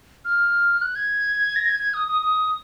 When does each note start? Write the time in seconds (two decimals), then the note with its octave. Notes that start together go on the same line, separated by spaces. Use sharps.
0.25 F6
0.81 F#6
0.96 G#6
1.56 A#6
1.66 G#6
1.80 G#6
1.94 D#6
2.08 D#6
2.22 D#6